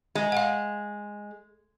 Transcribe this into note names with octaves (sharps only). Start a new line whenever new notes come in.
G#3
F5 F#5